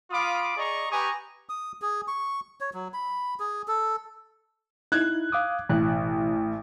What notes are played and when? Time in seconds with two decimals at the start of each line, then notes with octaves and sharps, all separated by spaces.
0.11 F4 F5 B5 D6 D#6
0.57 G#4 D5 D#5 A#5 C#6
0.90 G4 B4 G#5 A#5 C#6 D#6
1.49 D#6
1.82 G#4
2.08 C#6
2.61 C#5
2.74 F#3
2.93 B5
3.40 G#4
3.68 A4
4.92 D#4 E4 F#6 G#6
5.32 F5 D6 D#6
5.69 A1 B2 E3 F#6